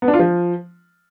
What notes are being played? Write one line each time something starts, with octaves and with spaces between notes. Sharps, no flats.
B3
D4
F4
F3